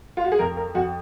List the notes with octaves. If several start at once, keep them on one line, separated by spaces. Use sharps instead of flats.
F4
F#4
G#4
F2 A#4
A#4
F2 F#4